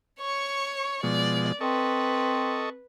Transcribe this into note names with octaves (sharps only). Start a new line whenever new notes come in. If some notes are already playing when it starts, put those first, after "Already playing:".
C#5 C#6
B2 F3 G#3 D5
C4 A4 B4 D#5 C#6